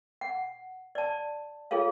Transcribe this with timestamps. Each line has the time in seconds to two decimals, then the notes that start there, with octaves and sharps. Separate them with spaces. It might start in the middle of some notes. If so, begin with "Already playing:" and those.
0.21 F#5
0.95 D5 A5
1.71 F4 G#4 A4 C#5 F5